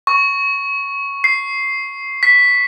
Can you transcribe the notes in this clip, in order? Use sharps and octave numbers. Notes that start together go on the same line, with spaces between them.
C#6
C7
B6